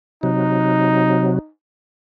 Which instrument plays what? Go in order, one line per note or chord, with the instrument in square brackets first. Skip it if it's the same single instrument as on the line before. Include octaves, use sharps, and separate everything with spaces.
[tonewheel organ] C3 F#3 [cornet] D#4